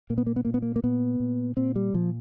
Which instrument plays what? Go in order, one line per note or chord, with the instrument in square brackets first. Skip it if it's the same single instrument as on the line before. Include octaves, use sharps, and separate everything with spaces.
[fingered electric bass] A#2 A#3
B3
A#3
B3
A#2 A#3
B3
A#3
A#3
A#2 B3
A#2
A#2 C4
G3
A#2 F3